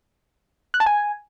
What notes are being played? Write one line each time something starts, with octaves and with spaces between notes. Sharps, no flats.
F#6
A5
G#5